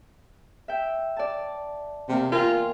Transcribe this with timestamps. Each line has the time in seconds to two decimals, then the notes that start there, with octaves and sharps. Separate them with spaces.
0.68 E5 G5
1.17 D5 A5
2.09 E2 C3 A#3
2.32 F4 A#4 G5 G#5